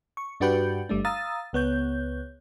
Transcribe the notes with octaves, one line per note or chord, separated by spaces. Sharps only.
C#6
G2 D4 F#4 G4 B4 G6
G1 G3 A3 D4
F5 A#5 D#6 E6 A6
C#2 B3 C#5 G6